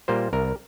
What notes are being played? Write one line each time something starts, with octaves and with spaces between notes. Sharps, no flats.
A#2 G3 A#3 C5
C2 A#4